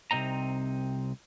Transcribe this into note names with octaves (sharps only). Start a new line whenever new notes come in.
C2 C3 C4 D#4 A#5